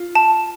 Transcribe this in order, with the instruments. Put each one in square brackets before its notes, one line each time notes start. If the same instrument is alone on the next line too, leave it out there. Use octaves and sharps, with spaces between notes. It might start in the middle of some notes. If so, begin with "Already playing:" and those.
Already playing: [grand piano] F4
[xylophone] A5